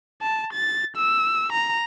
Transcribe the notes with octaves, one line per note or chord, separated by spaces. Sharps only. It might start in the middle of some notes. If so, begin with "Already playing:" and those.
A5
A6
E6
A#5